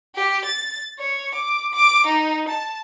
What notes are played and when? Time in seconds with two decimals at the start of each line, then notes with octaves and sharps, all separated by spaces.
0.15 G4
0.44 A6
0.99 C#5
1.34 D6
1.73 D6
2.07 D#4
2.48 A5